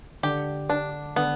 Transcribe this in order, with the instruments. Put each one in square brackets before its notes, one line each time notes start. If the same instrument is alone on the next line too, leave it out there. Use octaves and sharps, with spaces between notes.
[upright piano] D3 [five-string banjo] G4
[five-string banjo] D4
[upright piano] D3 [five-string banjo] B3